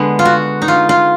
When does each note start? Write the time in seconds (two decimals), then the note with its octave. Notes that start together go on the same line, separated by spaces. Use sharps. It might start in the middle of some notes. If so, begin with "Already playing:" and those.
Already playing: D3 G#3 B3
0.19 F4
0.25 F#4
0.62 D#4
0.68 F4
0.89 F4